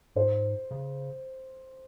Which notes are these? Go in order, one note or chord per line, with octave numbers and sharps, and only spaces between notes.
G#2 C5
C#3